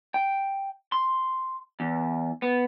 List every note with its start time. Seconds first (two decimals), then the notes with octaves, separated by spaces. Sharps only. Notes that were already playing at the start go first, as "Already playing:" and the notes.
0.14 G5
0.92 C6
1.80 E2
2.42 B3